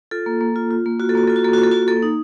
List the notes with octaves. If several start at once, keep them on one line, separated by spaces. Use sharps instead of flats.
F4 A4
A#3
A#3
F4
F4
A#3
F4 F#4
A4
A#3 F#4
F4 A4
F#4
A#3 A4
F#4
F4
A4
A#3 F#4
A#3 A4
D#4